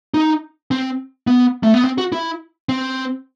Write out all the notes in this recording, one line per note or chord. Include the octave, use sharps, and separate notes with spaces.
D#4
C4
B3
A3
B3
C4
F#4
E4
C4